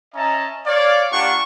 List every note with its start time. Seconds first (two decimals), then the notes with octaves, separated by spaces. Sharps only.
0.14 C#4 D#5 E5 A5 A#5
0.66 C#5 D5 F5
1.12 A#3 D4 F4 G4 F#5 C#6